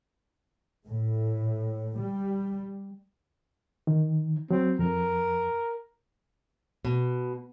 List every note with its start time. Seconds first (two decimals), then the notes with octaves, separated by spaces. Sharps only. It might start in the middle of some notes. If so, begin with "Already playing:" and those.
0.85 A2
1.98 G3
3.87 D#3
4.51 F#3 C4
4.79 F2 A#4
6.85 B2